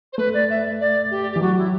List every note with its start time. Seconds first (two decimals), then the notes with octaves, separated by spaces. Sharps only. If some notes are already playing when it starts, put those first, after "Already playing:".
0.13 C5
0.18 A3 B4
0.33 D5
0.49 E5
0.80 D5
1.10 G4
1.32 E3 G4
1.41 F#3 F#4
1.57 E4